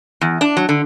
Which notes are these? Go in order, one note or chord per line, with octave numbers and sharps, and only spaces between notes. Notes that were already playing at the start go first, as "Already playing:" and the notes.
E2
D4
F#3
D3